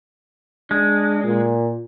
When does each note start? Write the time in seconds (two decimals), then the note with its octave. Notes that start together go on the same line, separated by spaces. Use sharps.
0.71 G#3 D4
1.24 A#2